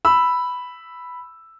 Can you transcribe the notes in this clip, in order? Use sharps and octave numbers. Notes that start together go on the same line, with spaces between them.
B5 E6